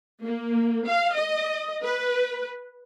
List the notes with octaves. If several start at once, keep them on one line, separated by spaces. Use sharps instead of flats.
A#3
F5
D#5
B4